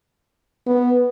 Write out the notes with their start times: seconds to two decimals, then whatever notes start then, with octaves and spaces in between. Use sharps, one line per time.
0.67 B3